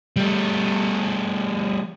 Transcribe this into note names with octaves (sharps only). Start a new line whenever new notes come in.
G3 A3